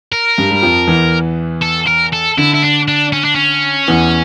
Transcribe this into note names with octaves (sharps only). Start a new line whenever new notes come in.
A#4
G2 G3
G3
F2 F3
E2 E3
A4
A#4
A4
D3 E4
E4
D4
D4
C#4
D4
C#4
E2 E3